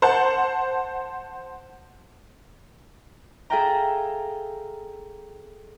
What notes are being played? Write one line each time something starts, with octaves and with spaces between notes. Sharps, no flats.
C5 F#5 A5
G#4 A4 E5 F5 G5 A#5